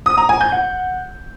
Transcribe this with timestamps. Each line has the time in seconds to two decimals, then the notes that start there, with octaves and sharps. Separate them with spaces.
0.06 D#6
0.18 A#5
0.29 G#5
0.41 G6
0.52 F#5